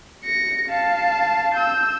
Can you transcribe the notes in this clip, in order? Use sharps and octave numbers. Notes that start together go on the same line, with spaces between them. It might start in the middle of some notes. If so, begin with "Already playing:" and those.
A#6 C#7
F5 A5
E6 G6